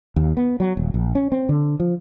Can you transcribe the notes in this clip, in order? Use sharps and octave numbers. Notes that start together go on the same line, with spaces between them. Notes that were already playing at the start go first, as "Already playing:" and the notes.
D#2
B3
F#3
D#1
A#1
C#4
C4
D3
F3